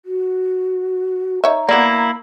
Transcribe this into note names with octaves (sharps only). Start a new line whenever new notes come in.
F#4
D#4 C#5 E5 A#5
A#3 B3 E4 D5